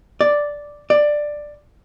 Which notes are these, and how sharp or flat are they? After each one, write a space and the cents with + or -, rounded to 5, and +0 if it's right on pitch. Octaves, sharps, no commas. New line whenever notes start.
D5 +0
D5 +10